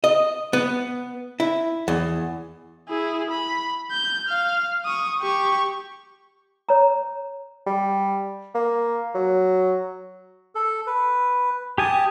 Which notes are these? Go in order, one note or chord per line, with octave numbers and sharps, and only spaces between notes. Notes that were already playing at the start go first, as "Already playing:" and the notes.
D#5
B3
E4
E2
E4 G#4
B5
G6
F5 F6
C#6 D#6
G4 C#6
C#5 A#5
G3
A#3
F#3
A4
B4
G4 G#5 A5 D#6